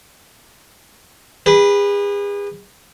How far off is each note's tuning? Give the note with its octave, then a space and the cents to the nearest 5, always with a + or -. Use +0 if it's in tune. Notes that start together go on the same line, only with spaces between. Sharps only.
G#4 -40 B4 -10